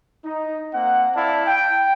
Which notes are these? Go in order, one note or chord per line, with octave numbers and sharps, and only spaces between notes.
D#4
A#3 C4 F#5
E4 D5 F5 A5
G5